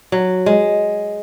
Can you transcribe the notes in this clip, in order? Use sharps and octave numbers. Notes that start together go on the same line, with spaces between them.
F#3
G#3